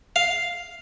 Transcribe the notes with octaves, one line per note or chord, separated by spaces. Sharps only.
F5